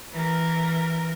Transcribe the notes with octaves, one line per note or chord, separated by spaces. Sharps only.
E3 A#4